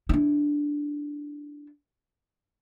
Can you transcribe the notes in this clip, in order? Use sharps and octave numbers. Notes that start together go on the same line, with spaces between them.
D4 E4